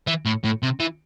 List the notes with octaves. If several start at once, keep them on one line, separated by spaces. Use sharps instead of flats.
E3
A2
A2
C3
E3